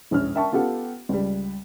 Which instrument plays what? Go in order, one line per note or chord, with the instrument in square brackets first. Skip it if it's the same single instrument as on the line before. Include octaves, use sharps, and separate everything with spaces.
[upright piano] E1 A#1 C#4 F6
A#4 E5 G5 A5 C#6
B3 F4 G4 A4 F#5
C#2 G3